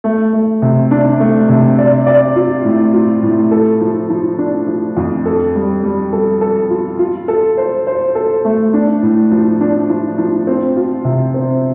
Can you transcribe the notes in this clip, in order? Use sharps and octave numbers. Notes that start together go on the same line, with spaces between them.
A3
A3
C3
D4
A3
C3
D5
D5
F4
A2
F4
A2
A4
F3
F3
D4
F3
F2
A4
G3
G3
A4
A4
F4
F4
A4
C5
C5
A4
A3
D4
A2
F3
D4
F3
F3
C4
F4
C3
C4